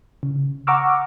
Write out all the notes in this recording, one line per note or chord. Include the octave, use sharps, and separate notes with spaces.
C#3
F#5 A#5 C#6 D6 E6 F6